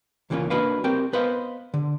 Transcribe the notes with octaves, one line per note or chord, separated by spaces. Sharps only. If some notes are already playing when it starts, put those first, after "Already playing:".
C#2 E3 A#3 B3 C#4 F4
A#3 D4 F#4 B4 D#5 F5
C4 G4 A#4 G5
B3 B4 C5 D#5 F5
D3